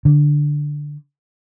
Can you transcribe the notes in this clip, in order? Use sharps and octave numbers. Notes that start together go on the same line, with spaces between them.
D3